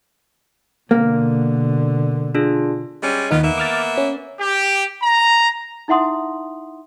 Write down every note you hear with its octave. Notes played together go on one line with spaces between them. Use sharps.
B2 D3 A#3
D4 F4 G#4
G3 G#3 C#4
D#2 D#3 B3 D#4 F4
A#3 B3 E5
D6 F6 A6
C#4
G4
A#5
D#4 E4 E5 F#5 C6 D#6